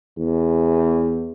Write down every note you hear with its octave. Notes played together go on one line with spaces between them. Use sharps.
E2